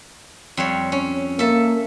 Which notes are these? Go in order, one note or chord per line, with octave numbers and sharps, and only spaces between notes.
F2 G3 C#5
C#4
A#3 A4 E5